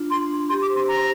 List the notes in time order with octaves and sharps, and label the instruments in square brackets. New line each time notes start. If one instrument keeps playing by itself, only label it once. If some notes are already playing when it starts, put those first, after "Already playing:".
Already playing: [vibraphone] D4 F4
[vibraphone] D4 [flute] C6
[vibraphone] D4
[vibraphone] G4 [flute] C6
[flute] D6
[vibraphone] C5
[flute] C6
[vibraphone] G4 [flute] A#5